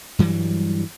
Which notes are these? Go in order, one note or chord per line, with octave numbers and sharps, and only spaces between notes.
G2 E3 F#3 G3